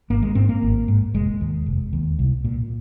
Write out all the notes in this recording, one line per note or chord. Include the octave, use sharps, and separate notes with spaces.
G#1 A#3
G#3
G#2 C4
A#3
G#1
G#2
F1 G#3
D#2
F1
D#2
C2
A#2